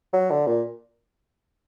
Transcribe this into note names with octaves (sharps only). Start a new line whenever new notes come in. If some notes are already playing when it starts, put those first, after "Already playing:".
F#3
D3
A#2